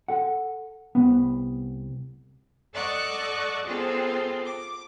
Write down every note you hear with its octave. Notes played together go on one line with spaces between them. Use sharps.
A4 F#5
C2 B3
A4 D5 D#5 F#5 C#6 F#6
B3 C4 F4 G#4 A4
D6